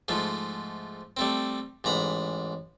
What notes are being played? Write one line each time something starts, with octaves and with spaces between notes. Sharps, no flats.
G#2 F3 A3
G3 A3 C4
A1 G#2 A#5 B5